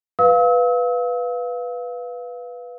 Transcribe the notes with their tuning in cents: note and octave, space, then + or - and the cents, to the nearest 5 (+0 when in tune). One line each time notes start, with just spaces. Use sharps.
B4 +0 F5 +0 E6 -40